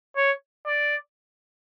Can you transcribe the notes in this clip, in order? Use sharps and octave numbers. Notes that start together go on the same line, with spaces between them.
C#5
D5